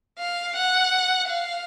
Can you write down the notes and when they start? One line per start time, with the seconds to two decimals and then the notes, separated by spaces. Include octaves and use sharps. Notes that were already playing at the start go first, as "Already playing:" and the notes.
0.19 F5
0.56 F#5
1.29 F5